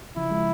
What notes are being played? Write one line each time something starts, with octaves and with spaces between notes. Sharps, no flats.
C#3 F3 E4
F3 G#3